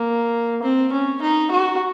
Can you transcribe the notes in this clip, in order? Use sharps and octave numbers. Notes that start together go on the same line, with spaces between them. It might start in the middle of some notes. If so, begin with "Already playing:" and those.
Already playing: A#3
C4
C#4
D#4
F#4